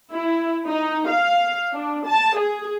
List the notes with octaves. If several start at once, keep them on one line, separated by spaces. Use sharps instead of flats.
E4
D#4
F5
D4
A5
G#4